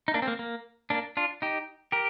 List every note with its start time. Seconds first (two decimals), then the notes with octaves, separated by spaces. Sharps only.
0.08 D#4
0.14 A#3 D4
0.22 C4
0.28 A#3
0.39 A#3
0.90 A#3 D4
1.17 D4 F4
1.42 D#4 G4
1.92 G4 A#4